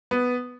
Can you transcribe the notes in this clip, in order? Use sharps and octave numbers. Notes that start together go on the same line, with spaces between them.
B3